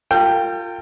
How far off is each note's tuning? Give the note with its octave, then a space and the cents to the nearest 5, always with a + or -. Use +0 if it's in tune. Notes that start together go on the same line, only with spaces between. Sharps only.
F4 +0 A#4 -45 G5 +0